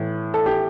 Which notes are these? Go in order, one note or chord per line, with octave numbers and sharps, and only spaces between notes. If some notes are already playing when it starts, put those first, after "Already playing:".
Already playing: A2 E3
A4
G4